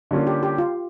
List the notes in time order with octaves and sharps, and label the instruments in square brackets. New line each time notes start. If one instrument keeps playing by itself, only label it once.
[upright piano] D3 G3 A#3 C#4 F4
[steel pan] G4
G4
F4